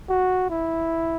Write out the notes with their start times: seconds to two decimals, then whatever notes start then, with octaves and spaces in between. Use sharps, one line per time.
0.09 F#4
0.50 E4